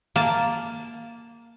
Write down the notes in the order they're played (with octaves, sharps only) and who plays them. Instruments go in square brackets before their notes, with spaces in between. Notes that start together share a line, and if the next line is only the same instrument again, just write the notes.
[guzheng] A#3 A5